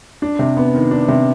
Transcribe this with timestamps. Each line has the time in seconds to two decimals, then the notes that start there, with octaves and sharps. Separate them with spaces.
0.22 D4
0.39 C3
0.57 B3
0.74 D#3
0.91 D4
1.08 C3